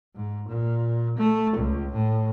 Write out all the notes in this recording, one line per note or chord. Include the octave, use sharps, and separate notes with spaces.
G#2
A#2
A3
C#2
A2